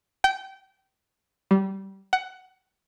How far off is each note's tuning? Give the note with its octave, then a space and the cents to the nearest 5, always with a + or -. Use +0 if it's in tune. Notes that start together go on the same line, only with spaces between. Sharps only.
G5 -25
G3 -20
F#5 +15